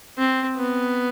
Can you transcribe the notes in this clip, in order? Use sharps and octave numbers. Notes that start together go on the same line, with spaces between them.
C4
B3